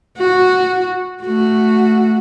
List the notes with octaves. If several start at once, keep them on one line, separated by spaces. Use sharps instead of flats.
F#4
A3 F#4